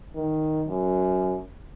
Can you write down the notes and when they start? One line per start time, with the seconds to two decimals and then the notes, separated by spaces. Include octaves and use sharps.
0.16 D#3
0.67 F#2